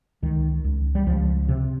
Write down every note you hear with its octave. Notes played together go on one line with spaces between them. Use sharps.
C#2 D#3
C#2
G3
C#2 F3
C3